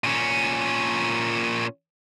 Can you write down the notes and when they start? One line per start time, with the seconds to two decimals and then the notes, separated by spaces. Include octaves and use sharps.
0.04 A#2 C#4